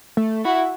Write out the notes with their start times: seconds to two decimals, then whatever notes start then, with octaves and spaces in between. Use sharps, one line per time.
0.17 A3
0.45 E4 F#4